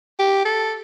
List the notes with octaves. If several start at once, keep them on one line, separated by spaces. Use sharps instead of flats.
G4
A4